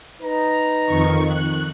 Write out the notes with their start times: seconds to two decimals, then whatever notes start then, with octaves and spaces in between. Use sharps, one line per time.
0.22 D#4 B4 A#5
0.86 F2 D#3 C#6
1.27 F#6